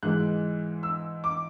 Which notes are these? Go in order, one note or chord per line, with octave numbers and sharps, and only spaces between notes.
G#2 E3 G#3 F#6
E6
D6